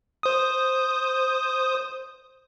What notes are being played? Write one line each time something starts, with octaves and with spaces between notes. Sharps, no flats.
C5 D#6